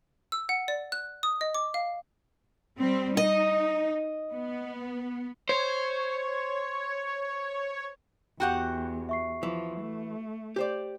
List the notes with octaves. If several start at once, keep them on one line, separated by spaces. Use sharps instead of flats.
E6
F#5
D5
F#6
D#6
D#5
D6
F5
G3 C4
D#4 D#5
B3
C5 C#5
E2 F#4 G4 F#5 G5 F#6 G6
E5 C#6 C7
E3 F3
A3
G4 C5 D5